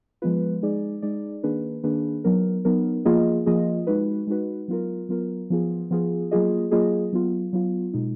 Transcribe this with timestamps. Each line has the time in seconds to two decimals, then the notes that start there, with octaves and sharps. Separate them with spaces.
0.22 F3 G#3 B3 F4 B4
0.62 G#3 D#4 G#4 D5
1.02 G#3 D#4 G#4 D5
1.43 D#3 A#3 D4 G#4 B4
1.84 D#3 A#3 D4 G#4 B4
2.24 F#3 B3 D#4 A#4
2.65 F#3 B3 D#4 A#4
3.05 F3 A#3 F4 G#4 D#5
3.46 F3 A#3 F4 G#4 D#5
3.87 G#3 D#4 F#4 B4
4.27 G#3 D#4 F#4 B4
4.68 F#3 B3 F4 A#4
5.09 F#3 B3 F4 A#4
5.50 F3 B3 F4 G#4
5.91 F3 B3 F4 G#4
6.31 F#3 A#3 F4 G#4 D#5
6.71 F#3 A#3 F4 G#4 D#5
7.13 F#3 B3 F4
7.53 F#3 B3 F4
7.93 B2 G#3 D#4